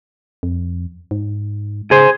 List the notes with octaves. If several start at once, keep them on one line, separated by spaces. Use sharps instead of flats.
F2
G#2
C#3 G#4 C5